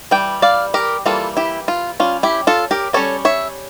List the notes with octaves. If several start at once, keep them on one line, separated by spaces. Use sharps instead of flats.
E3 G3 G5
D5 F5
G4 A#4
E3 G3 A#3 F4 A4
E4 G4
F4
G3 C#4 F4
E4 G4
F4 A4
G4 A#4
G3 C#4 A4 C#5
C#5 E5